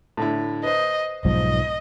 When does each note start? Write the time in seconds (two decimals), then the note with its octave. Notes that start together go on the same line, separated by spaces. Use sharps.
0.17 A2 D3 E4
0.63 B4 C5 D#5
1.25 B1 G#2 F3 D#5